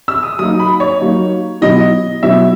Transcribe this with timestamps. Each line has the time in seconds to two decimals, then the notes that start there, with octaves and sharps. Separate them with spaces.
0.08 E6
0.23 D#6
0.39 F#3 A#3 D#4 D#6
0.60 B5
0.80 C#5
1.01 F#3 A#3 D#4
1.61 B2 F#3 B3 E4 D#5
2.23 B2 F#3 B3 E4 E5